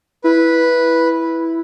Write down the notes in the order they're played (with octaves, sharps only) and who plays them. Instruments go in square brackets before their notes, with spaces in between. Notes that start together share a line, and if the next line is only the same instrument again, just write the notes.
[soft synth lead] E4 [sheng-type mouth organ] B4